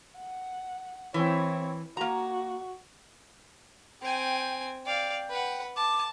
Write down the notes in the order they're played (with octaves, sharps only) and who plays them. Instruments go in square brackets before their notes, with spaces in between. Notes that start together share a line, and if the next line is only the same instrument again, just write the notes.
[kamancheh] F#5
[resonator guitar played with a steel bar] E3 [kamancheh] C4 C#5
[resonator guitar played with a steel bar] A#3 A#5 [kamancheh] F#4
[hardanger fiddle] C4 G#5 [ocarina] G5
[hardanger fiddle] D5 F5 [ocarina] G5
[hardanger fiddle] B4 F#5
[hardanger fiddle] A5 [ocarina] D6